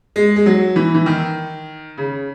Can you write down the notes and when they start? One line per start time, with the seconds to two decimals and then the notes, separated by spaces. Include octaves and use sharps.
0.16 G#3
0.36 G#3
0.46 F#3
0.76 E3
0.94 E3
1.06 D#3
1.98 C#3